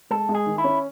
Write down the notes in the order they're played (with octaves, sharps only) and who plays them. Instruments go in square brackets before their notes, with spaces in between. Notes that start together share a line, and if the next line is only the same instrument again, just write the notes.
[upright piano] G#3 [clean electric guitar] A4
[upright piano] G#3
[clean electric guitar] G#4
[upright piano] D#3
[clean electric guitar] E4
[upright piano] C#4